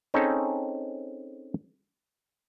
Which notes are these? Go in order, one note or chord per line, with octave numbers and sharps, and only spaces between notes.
C4 C#4 D#4 G#4 A4 C#5